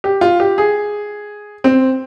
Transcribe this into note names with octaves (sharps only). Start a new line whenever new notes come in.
G4
F4
G4
G#4
C4